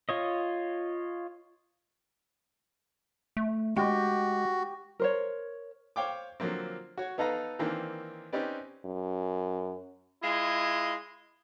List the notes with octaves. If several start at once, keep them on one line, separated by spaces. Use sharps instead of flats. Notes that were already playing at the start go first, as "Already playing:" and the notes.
F4 C#5 D#5
A3
G#3 F#4 G4
A#4 C5 C#5
C5 C#5 F5 G5 D6
D3 F3 F#3 A#3 C4
F#4 C#5
B3 D#4 A4 B4 F5 A#5
D#3 E3 A#3 C4 D4
C4 C#4 D#4 G4 B4 D5
F#2
G#3 E4 F4 D#5